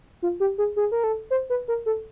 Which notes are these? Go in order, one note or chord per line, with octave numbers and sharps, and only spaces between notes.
F4
G4
G#4
G#4
A#4
A4
C5
B4
A#4
A4